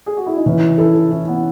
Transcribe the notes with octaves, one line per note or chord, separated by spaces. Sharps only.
G#4
F#4
E4
D#4
E3 C#4
E4 A4
C#4 E4
B3